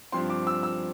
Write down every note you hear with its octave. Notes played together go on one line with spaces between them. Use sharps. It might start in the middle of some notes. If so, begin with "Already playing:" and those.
G2 F3 C4 C6
D6
E6
E6